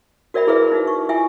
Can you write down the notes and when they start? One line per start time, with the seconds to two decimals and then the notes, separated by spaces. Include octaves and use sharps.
0.34 F#4 A#4 D5 E5 G5 B5
0.47 E4 G#4 A#4 B4 E5
0.72 D#4 F#4
0.88 C#6
1.09 E4 F4 E5 G5 G#5